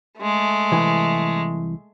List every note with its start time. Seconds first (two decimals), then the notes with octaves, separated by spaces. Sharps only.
0.19 G#3 A3
0.72 C2 E3